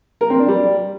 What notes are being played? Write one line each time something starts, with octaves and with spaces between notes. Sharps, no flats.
A#4
C4
D4
G3